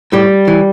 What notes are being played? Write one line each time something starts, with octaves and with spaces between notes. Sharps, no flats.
A2 G3
E3